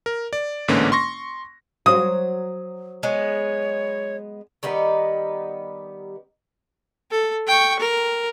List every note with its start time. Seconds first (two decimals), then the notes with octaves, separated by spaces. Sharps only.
0.06 A#4
0.33 D5
0.68 A1 G#2 D3 A#3 C#4 B4
0.92 C6 C#6 A#6
1.86 F#3 C5 D#6
3.03 G#3 B3 C#5
4.63 D#3 G3 B3 D#4
7.11 A4
7.47 G5 C#6
7.80 A#4